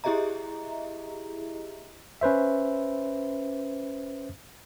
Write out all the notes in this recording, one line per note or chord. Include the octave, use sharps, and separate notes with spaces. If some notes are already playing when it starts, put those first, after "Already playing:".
E4 G4 G#4 D#5 E5 A#5
C#4 B4 C5 E5